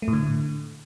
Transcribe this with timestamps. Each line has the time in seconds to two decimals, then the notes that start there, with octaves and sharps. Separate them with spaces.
0.02 A3
0.08 A2
0.13 D3